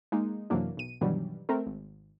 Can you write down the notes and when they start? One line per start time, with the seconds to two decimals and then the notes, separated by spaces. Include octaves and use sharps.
0.12 G#3 A#3 D#4
0.50 F#2 C3 E3 F#3 A#3 D4
0.77 B1 D#7
1.01 G2 B2 D#3 E3 F#3 G3
1.49 A3 C4 A#4
1.67 G#1